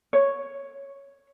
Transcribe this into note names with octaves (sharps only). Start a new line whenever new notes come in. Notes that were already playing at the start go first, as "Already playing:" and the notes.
C#5